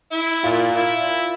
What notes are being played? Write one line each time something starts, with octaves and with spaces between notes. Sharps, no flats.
E4
A#2 F4
E4